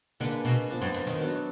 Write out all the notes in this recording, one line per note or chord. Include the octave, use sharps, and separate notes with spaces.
D3 A#3 D4 G#4 B4
B2
F3 B3 D4
F#2
F#2
D#3
F#3 B3 D4 F#4